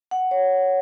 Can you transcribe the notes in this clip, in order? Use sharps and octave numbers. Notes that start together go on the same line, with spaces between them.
F#5
C#5